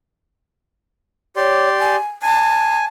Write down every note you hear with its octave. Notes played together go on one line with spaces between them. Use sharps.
G4 C#5 D5 C6
G#5
G#5 A5